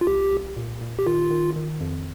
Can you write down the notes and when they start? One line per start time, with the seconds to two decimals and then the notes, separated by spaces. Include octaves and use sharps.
0.01 F4
0.07 C2 G4
0.32 C2
0.57 A#2
0.81 A#2
0.99 G4
1.06 D#3 F4
1.31 D#3
1.56 D#3
1.81 F2